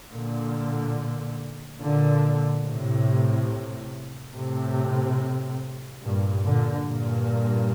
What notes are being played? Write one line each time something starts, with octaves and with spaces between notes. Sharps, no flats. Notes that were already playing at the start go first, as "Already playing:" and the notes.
A#2 D3
A#2 D3
A2 C3
A2 C3
G2 A#2
A#2 D3
G2 A#2